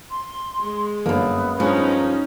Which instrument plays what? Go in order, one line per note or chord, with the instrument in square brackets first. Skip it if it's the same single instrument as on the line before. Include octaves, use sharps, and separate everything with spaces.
[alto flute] C6
[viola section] G#3
[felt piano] G1 [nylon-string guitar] F#2 A#3 [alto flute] B3
[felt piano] G2 G#3 [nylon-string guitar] F3 [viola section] C#4 D#4